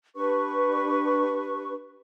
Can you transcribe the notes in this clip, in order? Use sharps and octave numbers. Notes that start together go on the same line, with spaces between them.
D4 G4 B4 C#6